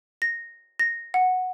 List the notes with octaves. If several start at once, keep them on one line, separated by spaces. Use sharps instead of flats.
A#6
A#6
F#5